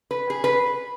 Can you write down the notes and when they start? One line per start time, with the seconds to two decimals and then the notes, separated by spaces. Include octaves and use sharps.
0.11 B4
0.30 G#4
0.44 B4